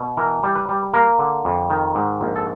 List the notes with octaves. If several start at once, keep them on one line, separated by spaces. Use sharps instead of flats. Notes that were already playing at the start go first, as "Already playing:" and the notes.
Already playing: B2
E3 A#4
G3
B4
G3
A#3 A#4
D3
F2
D#3
G#2
A#1
A4